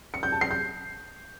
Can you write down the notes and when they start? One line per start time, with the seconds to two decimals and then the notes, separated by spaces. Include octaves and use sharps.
0.14 C#7
0.23 G6
0.32 A5
0.41 C7
0.51 G6